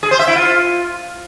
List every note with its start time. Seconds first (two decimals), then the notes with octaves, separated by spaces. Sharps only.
0.03 G#4
0.11 C5
0.19 E5
0.28 E4
0.36 F4